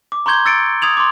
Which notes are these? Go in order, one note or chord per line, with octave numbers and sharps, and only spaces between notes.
D6
A#5 C6 C#6 G6 G#6 G7
E6 A6 C#7 D7
D#6 G#6 F7 F#7
C6 D6